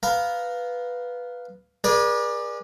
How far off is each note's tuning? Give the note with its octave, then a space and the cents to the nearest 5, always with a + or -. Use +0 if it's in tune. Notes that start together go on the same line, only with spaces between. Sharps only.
B3 +0 F5 +0 A#5 +0
G#4 -10 B4 -45 D5 +15